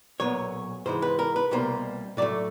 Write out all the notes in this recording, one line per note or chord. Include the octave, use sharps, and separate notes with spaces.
B1 A#2 F#3 B3 C#5
G#2 E3 G#3 C5
B4
A#4
B4
C2 B2 G3 A#3 C5
A2 F#3 A3 D5